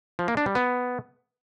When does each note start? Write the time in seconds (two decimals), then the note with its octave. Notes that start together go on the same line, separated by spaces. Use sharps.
0.19 F3
0.28 A#3
0.37 D4
0.46 G3
0.55 B3